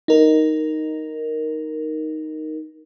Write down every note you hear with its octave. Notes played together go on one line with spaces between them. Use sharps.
D#4 A#4